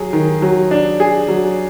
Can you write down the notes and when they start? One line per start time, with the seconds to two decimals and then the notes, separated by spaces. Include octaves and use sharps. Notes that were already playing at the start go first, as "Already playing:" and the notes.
Already playing: F#3 G#4
0.13 D#3
0.42 F#3
0.71 D4
1.00 G#4
1.28 F#3